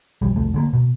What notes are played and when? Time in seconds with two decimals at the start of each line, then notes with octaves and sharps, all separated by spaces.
0.22 B1 F2 G3
0.36 C2 F2 A3
0.54 D3 G#3 A#3
0.73 B2